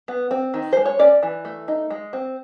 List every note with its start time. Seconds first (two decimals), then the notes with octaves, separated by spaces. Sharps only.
0.08 B3
0.31 C4
0.54 D#3
0.73 G#3 C5
0.86 C#5
0.99 C#4 D5
1.23 E3
1.45 A3
1.68 D#4
1.90 G#3
2.13 C4